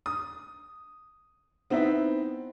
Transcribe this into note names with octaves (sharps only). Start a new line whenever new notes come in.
D#6
B3 C4 D#4 E4 E5